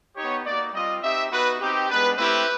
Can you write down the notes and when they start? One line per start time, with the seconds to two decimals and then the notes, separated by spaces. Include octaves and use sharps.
0.16 B3 D#4 G4 C#5
0.45 A#3 D#4 F#4 D5
0.73 G3 C4 F4 D#5
1.03 C4 D#4 G4 E5
1.31 B3 D#4 F#4 B4
1.60 C4 D#4 G4
1.89 G#3 B3 D4 B4
2.18 A3 C4 E4 G4 B4